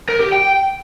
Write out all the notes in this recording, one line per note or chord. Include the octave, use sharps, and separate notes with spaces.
A#4
G4
G5